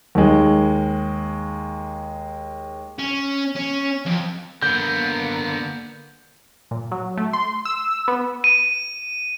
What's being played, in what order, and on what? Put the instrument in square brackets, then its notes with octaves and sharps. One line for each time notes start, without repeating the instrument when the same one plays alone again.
[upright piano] D#2 G#3
[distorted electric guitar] C#4
C#4
F2
[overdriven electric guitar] D3 B3 [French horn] A#3 [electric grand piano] G6
[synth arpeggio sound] A#2
F#3
A3
C6
E6
B3
[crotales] D#7